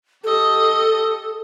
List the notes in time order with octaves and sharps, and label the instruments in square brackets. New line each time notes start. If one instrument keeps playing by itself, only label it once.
[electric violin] G4 D#5 [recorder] A4